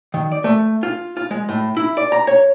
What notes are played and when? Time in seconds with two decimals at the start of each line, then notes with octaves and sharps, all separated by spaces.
0.14 D#3
0.32 D5
0.44 A3
0.83 F4
1.17 F4
1.31 G#3
1.49 A2
1.77 E4
1.97 D5
2.12 A#5
2.27 C#5